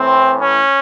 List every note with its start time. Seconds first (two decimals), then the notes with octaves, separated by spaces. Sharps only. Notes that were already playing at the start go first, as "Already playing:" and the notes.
Already playing: A2 E3 C4
0.41 C#4